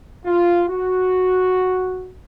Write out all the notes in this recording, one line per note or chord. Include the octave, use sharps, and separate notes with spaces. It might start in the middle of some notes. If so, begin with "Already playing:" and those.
F4
F#4